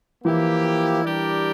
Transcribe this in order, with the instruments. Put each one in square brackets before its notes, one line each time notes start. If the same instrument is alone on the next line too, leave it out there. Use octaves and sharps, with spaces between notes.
[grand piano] E3 [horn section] F3 A#3 E4 G4
[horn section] G3 D4 G4 A#4 D5